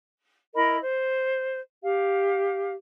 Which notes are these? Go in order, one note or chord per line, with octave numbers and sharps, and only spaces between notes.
E4 A#4 D#5 B5
C5
G4 F5